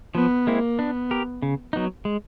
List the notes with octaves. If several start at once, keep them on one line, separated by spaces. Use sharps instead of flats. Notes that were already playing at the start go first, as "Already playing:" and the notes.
F3 B3
G#3 A#3 C4 E4
B3 D4
G4 A#4
C#3
F#3 B3 D#4
G#3